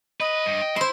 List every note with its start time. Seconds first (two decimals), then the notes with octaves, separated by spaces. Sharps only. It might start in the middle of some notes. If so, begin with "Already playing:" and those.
0.20 B4 D#5
0.46 G2
0.62 G5
0.76 E4 C5 C6